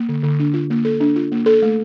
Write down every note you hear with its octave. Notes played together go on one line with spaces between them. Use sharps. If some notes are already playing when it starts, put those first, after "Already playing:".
Already playing: A#3
D3
D3
D4
F4
A#3
A4
D4
F4
A#3
A4
A3